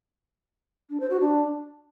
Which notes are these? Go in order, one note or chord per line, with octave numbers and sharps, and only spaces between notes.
D4
C5
F#4
D4